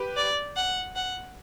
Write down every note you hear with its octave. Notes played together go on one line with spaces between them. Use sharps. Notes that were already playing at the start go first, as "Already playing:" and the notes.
Already playing: G4 B4
D5
F#5
F#5